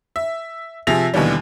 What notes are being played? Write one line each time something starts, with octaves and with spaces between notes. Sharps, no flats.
E5
C3 F3 G#4 E5 A#6 F7
D#2 B2 D3 E3 G3